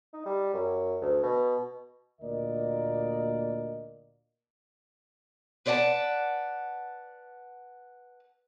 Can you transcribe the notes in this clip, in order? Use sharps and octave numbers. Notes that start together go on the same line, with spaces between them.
D#4
G3
F#2
D2
B2
D2 A#2 A#3 A#4 D5 D#5
B4 C5 D5 D#5 F#5 A5